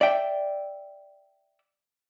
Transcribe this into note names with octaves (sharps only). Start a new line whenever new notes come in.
D5 E5 G5